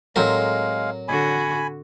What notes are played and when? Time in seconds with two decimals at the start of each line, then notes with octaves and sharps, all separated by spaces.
0.16 A2 F#3 G#3 C4 A#4 F5
1.08 D3 F#4 G#5 B5